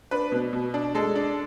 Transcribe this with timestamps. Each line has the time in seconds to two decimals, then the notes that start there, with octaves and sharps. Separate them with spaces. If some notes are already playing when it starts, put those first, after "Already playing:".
0.11 D4 B4
0.32 B2
0.53 B2
0.74 D4
0.95 G#3 A4
1.15 D4